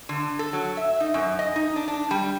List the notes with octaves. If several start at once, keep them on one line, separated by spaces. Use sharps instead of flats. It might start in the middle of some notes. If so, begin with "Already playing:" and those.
D3
A4
F#3
E5
D#4
F#2
D#5
D#4
D4
D4
G3